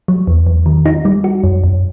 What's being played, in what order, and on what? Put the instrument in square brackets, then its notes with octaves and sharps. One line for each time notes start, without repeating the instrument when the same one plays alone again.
[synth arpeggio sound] F#3
E2
E2
D#3
D#4
G3
F#4
F#2
F#2